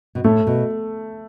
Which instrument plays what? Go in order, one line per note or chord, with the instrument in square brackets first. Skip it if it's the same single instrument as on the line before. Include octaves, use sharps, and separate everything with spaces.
[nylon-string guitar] B2
[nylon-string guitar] A2 [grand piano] A3
[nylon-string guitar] B2